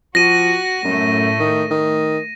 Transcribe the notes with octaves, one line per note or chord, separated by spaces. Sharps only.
F3 F#4 A#6 D#7
F#2 A2 A3
D#3
D#3